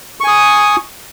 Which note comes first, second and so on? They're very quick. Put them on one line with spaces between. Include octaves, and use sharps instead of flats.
C#6 G#5 D#6